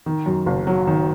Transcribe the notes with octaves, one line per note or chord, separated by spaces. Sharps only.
D#3
F#2
F#1
F#3
D#3